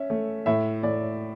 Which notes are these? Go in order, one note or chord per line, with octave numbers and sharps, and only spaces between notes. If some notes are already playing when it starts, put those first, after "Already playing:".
Already playing: C#4 E5
A3
A2 E5
A2 D5